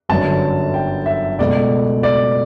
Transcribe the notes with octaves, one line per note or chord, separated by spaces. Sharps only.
G1 F#2 D3 F#3 A5
G5
E5
C#2 B2 A3 D5
D5